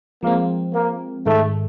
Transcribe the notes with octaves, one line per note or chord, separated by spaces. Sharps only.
F3 G#3 A#3 C4
A#3
G#2 D#3 G#3 A3